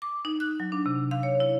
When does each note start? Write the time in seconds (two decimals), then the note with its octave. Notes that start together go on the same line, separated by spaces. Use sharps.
0.02 D6
0.25 D#4
0.40 F#6
0.60 F#3
0.72 D4
0.86 C3
1.11 F5
1.23 C#5
1.40 E4